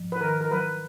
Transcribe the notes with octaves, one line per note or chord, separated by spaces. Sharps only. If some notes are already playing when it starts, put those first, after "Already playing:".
Already playing: G#2 F3
B4
D#3 A#4
A#4
F#3 B4